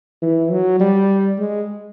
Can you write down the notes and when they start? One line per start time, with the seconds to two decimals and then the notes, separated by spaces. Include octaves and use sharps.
0.22 E3
0.51 F#3
0.80 G3
1.38 G#3